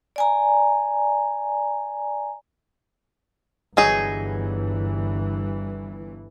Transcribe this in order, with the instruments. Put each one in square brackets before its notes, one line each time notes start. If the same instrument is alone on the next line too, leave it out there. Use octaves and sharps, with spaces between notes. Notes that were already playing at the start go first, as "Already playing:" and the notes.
[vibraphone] D5 G#5 A#5
[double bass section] G1 G2 E3 [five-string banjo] F#3 D#4 G#4